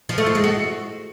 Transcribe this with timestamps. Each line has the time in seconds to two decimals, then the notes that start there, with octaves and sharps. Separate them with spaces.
0.09 F3
0.18 A3
0.26 F4
0.35 G#3
0.44 F#4